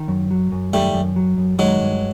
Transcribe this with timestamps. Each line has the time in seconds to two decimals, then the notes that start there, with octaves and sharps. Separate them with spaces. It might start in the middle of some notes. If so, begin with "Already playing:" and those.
Already playing: D#3
0.08 F#2
0.31 F#3
0.52 F#2
0.73 D#3 G3 A3
0.94 F#2
1.16 F#3
1.38 F#2
1.58 D#3 F#3 G#3
1.81 G2